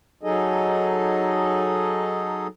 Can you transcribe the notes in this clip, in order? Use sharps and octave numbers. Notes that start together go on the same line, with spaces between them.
F#3 D#4 G#4 A4 D#5